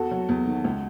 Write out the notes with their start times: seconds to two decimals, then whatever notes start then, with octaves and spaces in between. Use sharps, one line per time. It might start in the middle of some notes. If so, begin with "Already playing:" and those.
Already playing: E2 F#4 A4
0.11 F#3
0.29 E2
0.46 D#3
0.64 C#2